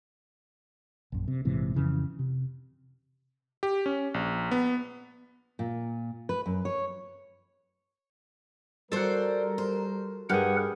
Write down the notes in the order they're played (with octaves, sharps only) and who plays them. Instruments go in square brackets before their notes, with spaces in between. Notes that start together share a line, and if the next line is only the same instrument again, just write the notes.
[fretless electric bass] A#1 F#2
C3
A#1 G#2 C3 E3
F2 C#3 E3
C3
[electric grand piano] G4
C#4
A#1
B3
[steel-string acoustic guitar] A#2
B4
F#2
C#5
[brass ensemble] G3 A#4 [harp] F#4 A4 [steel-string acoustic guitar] C5 D5
[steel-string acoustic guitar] C5
[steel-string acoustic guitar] G2 [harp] G4 G#4 [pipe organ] A#4 B4 F#5